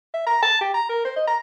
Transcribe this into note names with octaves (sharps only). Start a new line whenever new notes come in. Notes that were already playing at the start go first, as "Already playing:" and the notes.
E5
A#5
A5
G4
A#5
A#4
C5
D#5
A#5